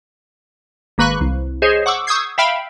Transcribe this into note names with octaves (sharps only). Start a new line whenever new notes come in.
G#1 A#3 B4 B5 C#6 F#6
C2
G#4 C5 C#5 D#5
F#5 C#6 D6 E6
C#6 D#6 E6 G6 G#6 C7
E5 F5 G5 B5 F6 D7